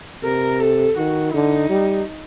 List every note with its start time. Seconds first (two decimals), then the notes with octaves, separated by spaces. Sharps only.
0.24 C3 A#4
0.60 A4
0.97 D#3 F#4
1.33 D3 D#4
1.69 G3